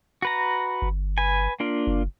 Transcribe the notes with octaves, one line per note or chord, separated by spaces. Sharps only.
F#4 B4 A#5
G1
B4 G#5
A#3 D4 F4
F#1